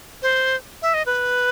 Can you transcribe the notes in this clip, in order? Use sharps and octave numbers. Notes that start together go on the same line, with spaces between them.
C5
E5
D#5
B4